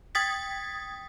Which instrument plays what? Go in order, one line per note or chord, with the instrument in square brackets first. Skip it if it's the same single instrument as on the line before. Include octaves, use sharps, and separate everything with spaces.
[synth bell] G5 D#6 G#6 A6 B6